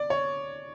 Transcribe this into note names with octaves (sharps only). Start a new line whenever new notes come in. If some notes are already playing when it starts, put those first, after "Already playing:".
Already playing: D5
C#5